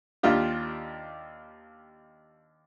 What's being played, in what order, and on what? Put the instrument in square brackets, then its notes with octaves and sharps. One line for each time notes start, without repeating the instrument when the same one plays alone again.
[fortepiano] D#2 D4 F4 G4